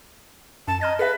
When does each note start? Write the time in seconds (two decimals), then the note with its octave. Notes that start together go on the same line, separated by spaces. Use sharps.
0.68 F#2 A5
0.81 D#5 A#5 F6 G#6
0.99 G#4 B4 E5